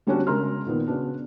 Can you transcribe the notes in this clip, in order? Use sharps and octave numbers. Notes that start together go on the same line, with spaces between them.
D3 G3 B3 C#4 D4 F#4
C#3 G#3 A#4 A#5 C6 F6
A#2 D#3 B3
C#3 B3 D4 F#4